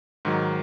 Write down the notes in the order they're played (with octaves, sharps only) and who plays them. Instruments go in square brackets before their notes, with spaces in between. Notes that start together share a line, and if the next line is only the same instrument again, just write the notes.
[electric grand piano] G#2 D#3 F#3